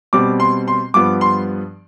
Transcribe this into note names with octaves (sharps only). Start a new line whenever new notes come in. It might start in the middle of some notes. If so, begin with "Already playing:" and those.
B2 G3 C4 D6
C6
C6
G2 F3 B3 D6
C6